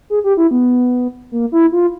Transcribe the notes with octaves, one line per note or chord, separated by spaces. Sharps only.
G#4
G4
E4
B3
A#3
E4
F4